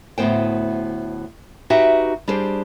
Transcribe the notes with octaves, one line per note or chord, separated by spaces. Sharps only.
D2 A2 C3 B3 C5 G5
D#4 F#4 G4 B4 E5 G5
G3 D4 G4 G#4 C5